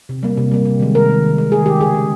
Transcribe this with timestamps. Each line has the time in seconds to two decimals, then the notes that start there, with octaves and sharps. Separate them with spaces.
0.09 C3
0.23 G3 A#3
0.37 C3
0.51 G3 A#3
0.65 C3
0.80 D#3 G#3
0.95 C3 A#4
1.10 D#3 G#3
1.24 D#3
1.38 G#3
1.52 D#3 G#4
1.66 G#3 G4
1.81 C#3 G#4
1.94 G#3